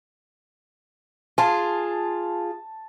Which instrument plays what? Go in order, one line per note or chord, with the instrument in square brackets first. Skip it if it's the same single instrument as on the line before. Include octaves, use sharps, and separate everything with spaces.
[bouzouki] F4 G#4 [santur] A5